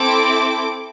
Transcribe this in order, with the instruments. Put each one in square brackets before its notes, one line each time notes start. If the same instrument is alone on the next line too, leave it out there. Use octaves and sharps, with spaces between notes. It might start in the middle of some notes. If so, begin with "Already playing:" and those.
Already playing: [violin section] C4 E4 A4 D6